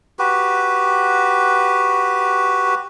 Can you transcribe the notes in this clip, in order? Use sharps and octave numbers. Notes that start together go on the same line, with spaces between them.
F#4 G4 B4